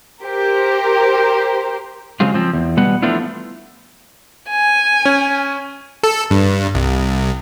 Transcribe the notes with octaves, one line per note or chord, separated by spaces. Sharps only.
G4 A#4 C5
C#3 F#3 G#3 C4 F4
F3 C4
E2
B2 G3 B3 F#5
F3 A3 B3 D4 E4 F4
G#5
C#4
A4
G2
C2